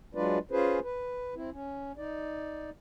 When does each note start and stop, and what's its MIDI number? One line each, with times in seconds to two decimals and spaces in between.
0.15 0.39 54
0.15 0.39 56
0.15 0.39 62
0.15 0.39 65
0.15 0.39 71
0.15 0.39 74
0.51 0.80 61
0.51 0.80 65
0.51 0.80 68
0.51 0.80 71
0.51 0.80 72
0.84 1.35 71
1.35 1.50 60
1.35 1.50 64
1.51 1.92 61
1.97 2.70 63
1.97 2.70 74